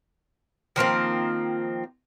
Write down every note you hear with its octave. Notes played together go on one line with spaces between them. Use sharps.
D#3 F3 A#3 C4